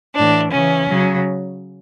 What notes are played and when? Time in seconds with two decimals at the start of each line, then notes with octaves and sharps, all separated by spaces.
0.15 A2 E3 D4
0.51 C#3 E3 C#4
0.87 C#3 F#3